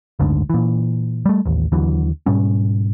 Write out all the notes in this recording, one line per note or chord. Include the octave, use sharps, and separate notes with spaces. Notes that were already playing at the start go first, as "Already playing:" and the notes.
F#1 D2 G#2 D3
A#2 E3
G3 A3
A1 D#2
D#2 D3 E3 F#3
G#2 B2 G3 C#4